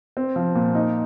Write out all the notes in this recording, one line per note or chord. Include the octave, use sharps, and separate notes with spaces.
C4
F3
A#2
D#4